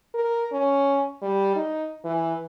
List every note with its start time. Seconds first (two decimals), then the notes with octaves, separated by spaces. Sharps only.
0.14 A#4
0.52 C#4
1.22 G3
1.55 D#4
2.05 E3